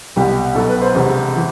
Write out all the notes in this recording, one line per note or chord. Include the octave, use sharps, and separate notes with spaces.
C2 B2 G4
B1 B2 A4
B4
C5
E1 E2 C3
E3